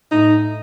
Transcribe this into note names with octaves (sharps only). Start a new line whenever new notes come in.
A2 D#4